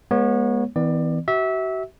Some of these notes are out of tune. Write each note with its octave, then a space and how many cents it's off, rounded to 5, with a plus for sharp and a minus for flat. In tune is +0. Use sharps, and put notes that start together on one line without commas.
G#3 +0 B3 -35 C#5 -10
E3 -30 B3 +30 D5 +25
F#4 +40 E5 -20